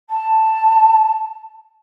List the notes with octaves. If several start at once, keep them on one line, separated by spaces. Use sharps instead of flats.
A5